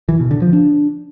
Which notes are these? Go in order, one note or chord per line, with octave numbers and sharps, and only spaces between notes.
E3
B2
D3
F3
D4